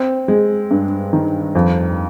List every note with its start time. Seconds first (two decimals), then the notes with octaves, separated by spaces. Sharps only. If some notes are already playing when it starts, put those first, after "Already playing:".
Already playing: C4
0.28 G#3
0.71 G2
1.13 D#3
1.55 F2